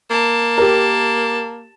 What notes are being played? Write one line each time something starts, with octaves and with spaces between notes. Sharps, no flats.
A#3 A5
G4 A#4